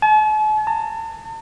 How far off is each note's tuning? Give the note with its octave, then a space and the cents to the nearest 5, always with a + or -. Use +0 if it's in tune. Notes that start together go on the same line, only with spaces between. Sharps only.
A5 -45
A5 +45